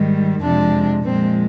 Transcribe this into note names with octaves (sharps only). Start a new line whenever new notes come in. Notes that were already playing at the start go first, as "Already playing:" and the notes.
Already playing: G#2 D#3 G3
F2 C3 F3 G#3 D4
A#2 F3 G#3 C4